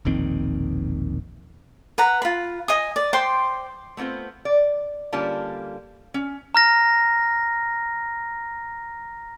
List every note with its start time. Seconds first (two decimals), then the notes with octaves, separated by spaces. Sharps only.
0.05 E1 A#1 D#3 C4
1.98 B4 F#5 A#5
2.22 F4 B5
2.68 D#5 G#5 D#6
2.96 D5
3.13 C5 G5 C6 D6
3.97 A3 B3 C4 F4 C5
4.45 D5
5.13 D3 G3 A#3 C#4 F4 A5
6.14 C#4
6.55 A#5 F6 A#6